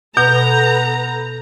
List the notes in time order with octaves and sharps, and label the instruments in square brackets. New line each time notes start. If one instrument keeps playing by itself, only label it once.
[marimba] B2 [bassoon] B3 [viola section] A4 B4 A#5 [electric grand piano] G6